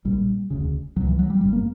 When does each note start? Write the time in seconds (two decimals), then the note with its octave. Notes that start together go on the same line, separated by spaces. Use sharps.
0.05 A#1 A#2 G3
0.50 E1 D2 C#3
0.96 C#2 B2 F#3
1.07 E3
1.19 F#3
1.30 G3
1.41 G1 F#2 C#3 G3
1.53 A#3